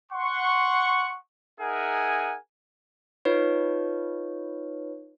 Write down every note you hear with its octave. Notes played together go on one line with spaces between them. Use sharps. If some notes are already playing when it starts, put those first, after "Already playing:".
F#5 C6 C#6
D#4 G#4 A#4 E5 F#5 G#5
D#4 F4 B4 C#5